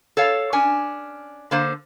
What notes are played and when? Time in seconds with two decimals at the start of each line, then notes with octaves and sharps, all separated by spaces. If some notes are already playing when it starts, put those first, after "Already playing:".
0.17 A4 C#5 F5
0.53 C#4 D4 G#5
1.51 D3 A#3 C5